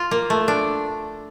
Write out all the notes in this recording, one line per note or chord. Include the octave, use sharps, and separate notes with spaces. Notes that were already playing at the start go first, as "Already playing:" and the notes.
Already playing: F4
A#3
A3
D4